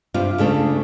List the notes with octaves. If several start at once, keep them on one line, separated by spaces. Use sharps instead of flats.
G2 C3 D4 F4
D2 C#3 A3 D4